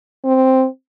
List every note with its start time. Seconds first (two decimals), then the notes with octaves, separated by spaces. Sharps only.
0.25 C4